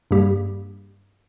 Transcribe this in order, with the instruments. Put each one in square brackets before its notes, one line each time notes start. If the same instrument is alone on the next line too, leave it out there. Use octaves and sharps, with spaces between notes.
[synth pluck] G2 G3 A#3 G4